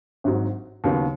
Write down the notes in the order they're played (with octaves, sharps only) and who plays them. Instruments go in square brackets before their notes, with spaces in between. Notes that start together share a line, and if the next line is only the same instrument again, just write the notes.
[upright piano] G#1 G#2 F#3
D#2 C#3 F#3 B3